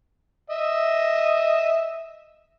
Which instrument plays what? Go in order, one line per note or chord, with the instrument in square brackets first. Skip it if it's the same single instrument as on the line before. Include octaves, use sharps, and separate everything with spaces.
[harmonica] D#5 E5